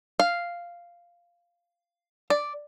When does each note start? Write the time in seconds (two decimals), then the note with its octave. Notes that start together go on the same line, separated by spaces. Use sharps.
0.20 F5
2.30 D5